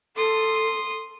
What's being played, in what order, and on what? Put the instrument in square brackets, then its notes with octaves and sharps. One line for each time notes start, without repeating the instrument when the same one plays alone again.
[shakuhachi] A4 [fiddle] C6 D#6